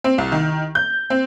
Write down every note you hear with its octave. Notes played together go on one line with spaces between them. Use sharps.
C4
C2
D#3
G6
C4